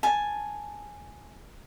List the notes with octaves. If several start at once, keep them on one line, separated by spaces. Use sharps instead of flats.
G#5 A5